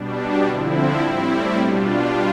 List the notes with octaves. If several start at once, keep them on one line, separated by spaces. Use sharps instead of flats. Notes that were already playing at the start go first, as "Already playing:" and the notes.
Already playing: B2 G3 D4
D3 F3 C4 E4
A2 G3 C4 E4
B2 G3 D4 F4